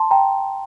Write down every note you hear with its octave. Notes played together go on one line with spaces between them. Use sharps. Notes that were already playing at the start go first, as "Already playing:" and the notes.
Already playing: A5 C6
G5 A#5